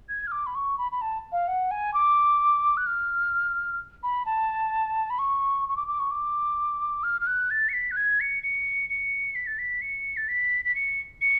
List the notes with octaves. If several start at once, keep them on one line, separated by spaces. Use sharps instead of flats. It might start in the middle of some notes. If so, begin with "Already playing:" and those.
G#6
F6
D6
B5
C#6
B5
B5
A5
F5
F#5
G#5
D6
F#6
F6
B5
A5
B5
C#6
C#6
D6
D6
C#6
D6
F6
F6
F#6
A6
C#7
B6
F#6
G#6
C#7
C#7
C#7
B6
A6
B6
C#7
A6
B6
B6
C#7
C#7